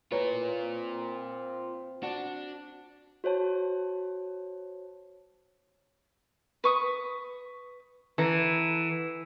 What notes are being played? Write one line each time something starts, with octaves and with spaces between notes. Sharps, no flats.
A2 F4 A#4 B4 C#5
C4
D4 F#4
F#4 C5 C#5 A5
B4 C#6 D#6
E3 A4 F#5 A#5